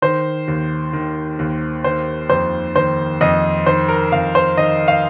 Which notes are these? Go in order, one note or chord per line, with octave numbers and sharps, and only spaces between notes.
D#3 C5
D#2
D#3
D#2
D#3 C5
F2 C5
D#3 C5
F2 D#5
D#3 C5
A#4
F2 F5
C5
D#3 D#5
F5